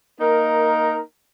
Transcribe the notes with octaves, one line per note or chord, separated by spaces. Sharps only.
A#3 D#4 A#4